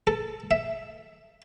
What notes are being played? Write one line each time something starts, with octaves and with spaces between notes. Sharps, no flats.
A4
E5